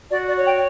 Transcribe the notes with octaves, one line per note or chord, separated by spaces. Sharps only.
F#4 D5
D5
C#5
G5